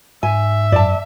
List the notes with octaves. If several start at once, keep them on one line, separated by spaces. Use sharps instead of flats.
G#2 E5 G#5
F#2 D5 A5